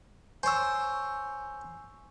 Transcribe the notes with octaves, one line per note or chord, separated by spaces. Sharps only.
C5 C#5 G#5 E6